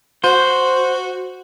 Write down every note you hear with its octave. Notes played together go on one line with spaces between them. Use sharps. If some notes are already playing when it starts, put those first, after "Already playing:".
F#4 C5